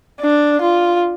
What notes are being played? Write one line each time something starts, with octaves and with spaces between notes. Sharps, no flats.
D4
F4